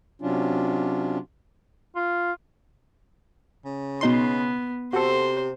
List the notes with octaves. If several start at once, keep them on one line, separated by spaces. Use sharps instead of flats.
C3 F#3 C#4 D4 F4
F4
C#3
B2 B3 D#4 C6
C3 F#4 A4 C5